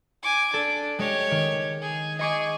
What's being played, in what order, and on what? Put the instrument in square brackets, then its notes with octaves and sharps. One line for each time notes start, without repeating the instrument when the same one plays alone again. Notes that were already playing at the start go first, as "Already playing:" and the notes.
[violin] G#5 D6
[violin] D4 [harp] A4
[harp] G#3 [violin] G4 C#5
[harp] D#3
[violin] G#4
[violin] G#4 [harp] D#5 C#6 D6